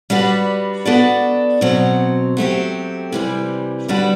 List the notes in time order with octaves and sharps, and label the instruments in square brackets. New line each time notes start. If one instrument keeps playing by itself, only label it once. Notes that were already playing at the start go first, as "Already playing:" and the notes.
[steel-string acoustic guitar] G3 D4 F#4 B4
B3 D4 F#4 A4 D5
B2 F#3 C4
F#3 A3 C4 G4
C3 E3 G3
D3 G3 D4 F#4 B4